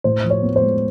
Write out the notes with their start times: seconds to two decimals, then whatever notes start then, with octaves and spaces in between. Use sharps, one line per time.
0.04 A2 C5
0.24 F3
0.30 C#5
0.43 B3
0.56 C5
0.61 G#3